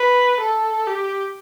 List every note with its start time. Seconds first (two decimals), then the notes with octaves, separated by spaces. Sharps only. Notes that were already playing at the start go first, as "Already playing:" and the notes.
Already playing: B4
0.39 A4
0.87 G4